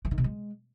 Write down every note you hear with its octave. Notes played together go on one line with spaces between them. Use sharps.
E3
D#3
B2
G#3